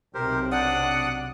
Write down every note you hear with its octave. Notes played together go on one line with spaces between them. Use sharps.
B1 C3 G4 A#4 C5
D4 D5 F#5 D#6